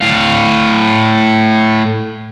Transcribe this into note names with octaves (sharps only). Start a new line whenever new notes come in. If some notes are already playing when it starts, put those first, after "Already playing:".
A2 F5